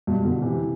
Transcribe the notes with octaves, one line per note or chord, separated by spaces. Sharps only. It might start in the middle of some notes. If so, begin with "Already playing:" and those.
G2 B2
B2 D3
C3 E3